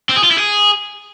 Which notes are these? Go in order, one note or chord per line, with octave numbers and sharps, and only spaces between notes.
C4
G#4
F4
E4
G#4